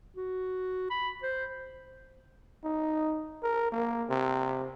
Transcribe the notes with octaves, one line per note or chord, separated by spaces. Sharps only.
F#4
B5
C5
D#4
A#4
A#3
C3